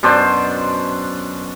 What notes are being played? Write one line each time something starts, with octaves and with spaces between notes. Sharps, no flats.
F#2 B2 D4 C5